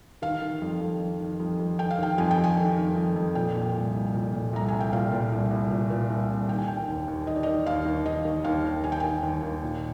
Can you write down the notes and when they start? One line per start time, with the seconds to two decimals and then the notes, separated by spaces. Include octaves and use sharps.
0.22 D#3 F5
0.42 D#3
0.61 F2
0.81 F2
1.00 D#3
1.21 D#3
1.40 F2
1.59 F2
1.78 D#3 G5
1.91 F5
1.99 D#3 G5
2.18 F2 G#5
2.31 G5
2.38 F2
2.44 G#5
2.57 D#3
2.77 D#3
2.96 F2
3.16 F2
3.35 A#2 G5
3.55 A#2
3.74 C2
3.94 C2
4.14 A#2
4.34 A#2
4.53 C2 A#5
4.68 C2 G#5
4.80 G5
4.93 A#2 F5
5.12 A#2
5.32 C2
5.51 C2
5.70 A#2
5.90 A#2
6.10 C2
6.30 C2
6.49 D#3 G5
6.58 G#5
6.68 D#3 G5
6.88 D#2
7.08 D#2
7.27 D#3 D#5
7.36 D5
7.43 D#5
7.47 D#3
7.66 D#2 F5
7.86 D#2
8.06 D#3 D#5
8.25 D#3
8.44 D#2 F5
8.64 D#2
8.84 D#3 G#5
8.92 G5
9.00 D#3 G#5
9.23 D#2
9.43 D#2
9.63 A#2